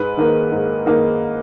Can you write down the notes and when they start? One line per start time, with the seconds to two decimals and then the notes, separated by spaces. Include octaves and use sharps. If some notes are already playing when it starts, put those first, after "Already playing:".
Already playing: G#2 B4
0.17 D#3 A#3 D#4
0.51 G#2
0.86 D#3 A#3 D#4